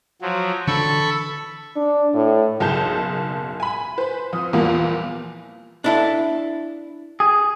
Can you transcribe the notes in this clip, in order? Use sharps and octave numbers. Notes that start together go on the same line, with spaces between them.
F3 F#3
D3 E3 D4 A4 B5 C#6
D4
A2
F#1 B1 G#4 A5 G6
G#5 B5
B4 C5
F2 D#6
E2 A#2 F3 G3 A#3 B3
D4 E4 A4
G#4